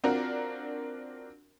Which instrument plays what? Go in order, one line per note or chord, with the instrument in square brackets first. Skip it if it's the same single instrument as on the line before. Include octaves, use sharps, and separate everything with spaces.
[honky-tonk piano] C4 D4 F4 F#4 A#4